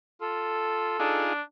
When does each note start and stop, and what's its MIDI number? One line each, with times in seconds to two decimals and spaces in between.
0.21 0.95 65
0.21 1.23 69
0.99 1.41 62
0.99 1.33 63
0.99 1.33 65
0.99 1.33 68